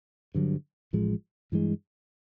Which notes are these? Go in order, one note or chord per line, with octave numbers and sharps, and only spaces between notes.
G2 D3 F#3
A1 A2 F3 G#3
G2 E3 G#3